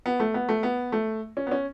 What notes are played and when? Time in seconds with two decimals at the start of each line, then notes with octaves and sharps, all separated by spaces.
0.06 B3
0.20 A3
0.34 B3
0.49 A3
0.63 B3
0.92 A3
1.37 C#4
1.47 B3
1.51 C#4